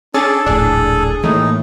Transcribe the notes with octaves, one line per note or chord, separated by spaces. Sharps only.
C#4 D4 G#4 A4 A6
D#1 A#1 A2 D4 G#4
A2 E3 A3 A#3 D#4